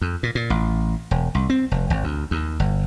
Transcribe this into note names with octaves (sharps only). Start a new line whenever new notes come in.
F2
A#2
A#2
A1
E1
C2
C4
F1
G#1
D2
D#2
G1